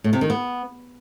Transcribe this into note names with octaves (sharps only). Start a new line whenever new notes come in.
A2
C3
D#3
B3